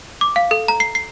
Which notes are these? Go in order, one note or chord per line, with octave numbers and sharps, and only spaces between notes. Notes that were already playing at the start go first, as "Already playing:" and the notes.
D6
F5
A4
A#5
C7
C7